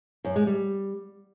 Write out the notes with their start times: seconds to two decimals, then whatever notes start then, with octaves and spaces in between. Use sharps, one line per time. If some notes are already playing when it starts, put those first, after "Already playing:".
0.25 F#2
0.36 G#3
0.47 G3